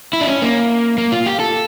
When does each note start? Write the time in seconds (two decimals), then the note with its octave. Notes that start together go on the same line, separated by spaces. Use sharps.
0.13 E4
0.21 D4
0.28 C#4
0.42 A#3
0.98 A#3
1.12 F4
1.26 G4
1.40 A4